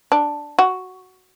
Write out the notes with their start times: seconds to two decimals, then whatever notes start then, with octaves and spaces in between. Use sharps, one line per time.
0.12 D4
0.59 F#4